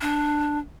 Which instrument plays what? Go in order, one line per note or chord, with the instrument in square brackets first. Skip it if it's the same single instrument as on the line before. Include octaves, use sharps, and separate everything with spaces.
[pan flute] D4